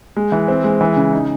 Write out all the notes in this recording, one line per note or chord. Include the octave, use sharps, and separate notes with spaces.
G#3
E3
C4
G#3
E3
C#3
D#4